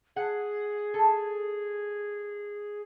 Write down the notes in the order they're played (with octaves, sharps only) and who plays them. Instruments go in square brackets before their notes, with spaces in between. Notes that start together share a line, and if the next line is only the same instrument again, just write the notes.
[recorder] G#4 [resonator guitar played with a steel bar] F#5
[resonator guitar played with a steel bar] A4